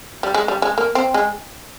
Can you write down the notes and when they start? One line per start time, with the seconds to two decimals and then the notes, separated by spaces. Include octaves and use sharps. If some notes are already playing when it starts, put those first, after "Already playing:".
0.23 G3
0.34 G#3
0.48 G3
0.62 G#3
0.78 A#3
0.95 C4
1.14 G#3